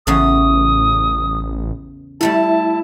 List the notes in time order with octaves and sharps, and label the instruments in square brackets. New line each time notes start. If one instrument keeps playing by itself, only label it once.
[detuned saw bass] A1 [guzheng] E2 C#3 A4 [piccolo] D#6
[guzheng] G3 A3 A4 [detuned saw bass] E4 [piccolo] A5